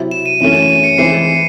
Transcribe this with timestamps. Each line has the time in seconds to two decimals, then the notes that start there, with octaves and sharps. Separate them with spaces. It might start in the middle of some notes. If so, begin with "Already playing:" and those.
Already playing: C3 F#3 C4 E4
0.11 E7
0.26 D#7
0.40 F#2 E3 A3 C#4 D#7
0.55 D#7
0.69 D#7
0.84 C#7
0.98 E3 G#3 C4 E4 C7